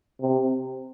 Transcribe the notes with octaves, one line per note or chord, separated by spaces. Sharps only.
C3